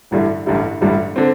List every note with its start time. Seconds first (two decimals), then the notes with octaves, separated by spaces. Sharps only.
0.11 A1 G2 D3 G3 E4
0.46 A1 G2 D3 G3 E4
0.81 A1 G2 D3 G3 E4
1.16 D3 C4